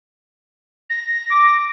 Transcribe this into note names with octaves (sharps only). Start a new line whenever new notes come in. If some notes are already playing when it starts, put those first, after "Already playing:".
A#6
D6